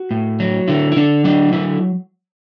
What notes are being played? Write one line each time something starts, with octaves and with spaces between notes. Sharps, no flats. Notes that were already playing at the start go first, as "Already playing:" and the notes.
Already playing: F#4
A2
F#3
D3 E4
E4
D3 D4
F#3 D4
D3 E4